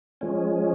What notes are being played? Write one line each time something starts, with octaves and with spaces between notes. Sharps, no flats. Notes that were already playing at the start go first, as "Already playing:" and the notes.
F3 G#3 C#4